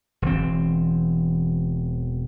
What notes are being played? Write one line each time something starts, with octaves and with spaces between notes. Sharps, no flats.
E1 E3 C4